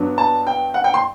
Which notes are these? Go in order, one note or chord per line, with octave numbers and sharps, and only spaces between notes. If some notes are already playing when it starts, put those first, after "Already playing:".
Already playing: G2 F#3 B3 D4
A5
G5
F#5
G5
C6